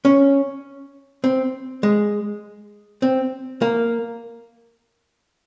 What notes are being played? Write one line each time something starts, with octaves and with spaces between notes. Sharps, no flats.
C#4
C4
G#3
C4
A#3